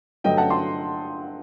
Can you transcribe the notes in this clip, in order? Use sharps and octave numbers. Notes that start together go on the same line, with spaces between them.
G2 D3 F#3 A3 D#5 G5
F#5 A5
A5 C6